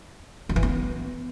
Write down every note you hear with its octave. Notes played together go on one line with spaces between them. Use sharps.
D#3
E3
B3